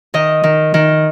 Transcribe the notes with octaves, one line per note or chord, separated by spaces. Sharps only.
D#3 D#5
D#3
D#3